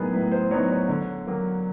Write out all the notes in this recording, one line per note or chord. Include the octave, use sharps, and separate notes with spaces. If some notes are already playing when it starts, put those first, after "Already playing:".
Already playing: A2 F#3 B3 D#4 G#4 A#4 B4
A2 B4
C5
F#3 B3 D#4 C#5
C#5
D3 C#5
F#3 A#3